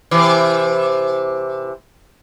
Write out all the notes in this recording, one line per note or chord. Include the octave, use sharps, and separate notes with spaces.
C3 E3